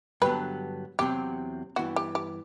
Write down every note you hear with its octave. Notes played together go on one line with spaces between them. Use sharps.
G2 D3 F#3 B3 B4
E2 C3 F#3 C4 G4
G2 E3 B3 F#4
G4
G4